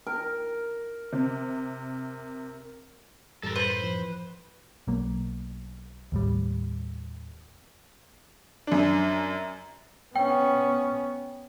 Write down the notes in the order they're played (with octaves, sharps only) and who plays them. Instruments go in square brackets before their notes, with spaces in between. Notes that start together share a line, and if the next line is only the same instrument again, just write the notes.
[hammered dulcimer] A#4
[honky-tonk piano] C3
[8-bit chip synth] F#2 A2 E3 [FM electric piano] G3 [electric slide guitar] A4 A#4
[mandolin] B4 [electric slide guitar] C5
[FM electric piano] F3
[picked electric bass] B1 F#3 A#3
D#2 A2 G3
[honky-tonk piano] F#2 D4
[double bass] B3 C#4 [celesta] G5